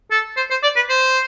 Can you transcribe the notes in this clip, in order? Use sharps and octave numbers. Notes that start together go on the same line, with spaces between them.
A4
C5
C5
D5
B4
C5